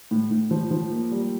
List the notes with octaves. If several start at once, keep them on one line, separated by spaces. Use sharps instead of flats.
A2
A2
F3
F3
A#3
G3